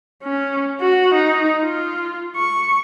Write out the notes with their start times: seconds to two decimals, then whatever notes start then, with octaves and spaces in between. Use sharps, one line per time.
0.23 C#4
0.80 F#4
1.14 D#4
1.62 F4
2.36 C#6